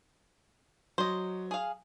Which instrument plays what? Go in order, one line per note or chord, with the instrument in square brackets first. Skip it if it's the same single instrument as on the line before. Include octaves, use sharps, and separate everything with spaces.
[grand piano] F#3 [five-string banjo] C5 D#5
[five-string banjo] G#4 F5